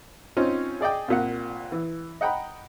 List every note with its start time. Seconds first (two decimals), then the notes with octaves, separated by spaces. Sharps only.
0.37 C4 C#4 D#4 F4
0.81 G#4 D5 D#5 G5
1.08 C2 A#2 F#5
1.72 E3
2.21 D#5 F#5 G5 A#5 B5